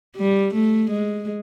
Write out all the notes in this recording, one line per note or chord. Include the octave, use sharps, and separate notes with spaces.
G3
A3
G#3